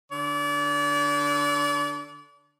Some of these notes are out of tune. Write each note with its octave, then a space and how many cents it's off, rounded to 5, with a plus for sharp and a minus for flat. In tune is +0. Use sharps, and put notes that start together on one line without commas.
D3 +0 D5 -35